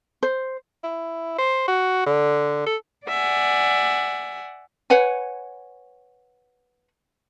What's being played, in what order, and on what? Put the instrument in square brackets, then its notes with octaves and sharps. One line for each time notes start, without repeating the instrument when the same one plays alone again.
[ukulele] C5
[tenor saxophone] E4
C5
F#4
D3
A4
[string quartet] D5 E5 F#5 G#5
[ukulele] B4 C#5 F#5 G#5